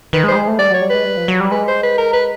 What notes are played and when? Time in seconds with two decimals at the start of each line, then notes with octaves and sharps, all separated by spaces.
0.13 D#3 B4
0.24 G#3
0.28 G3 C5
0.36 G#3
0.48 A3
0.59 G3 D5
0.71 F#3 C#5
0.82 G3
0.90 G#3 B4
1.05 G3
1.17 F3
1.28 F#3
1.40 G3
1.51 G#3 B4
1.67 C5
1.83 B4
1.98 A#4
2.13 B4